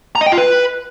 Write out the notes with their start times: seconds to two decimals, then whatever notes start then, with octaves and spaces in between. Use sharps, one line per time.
0.15 A#5
0.21 D#5
0.26 G5
0.32 F4
0.38 B4